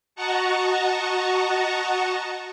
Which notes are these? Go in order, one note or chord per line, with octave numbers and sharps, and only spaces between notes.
F#4 D#5 F#5 A5 A#5 C#6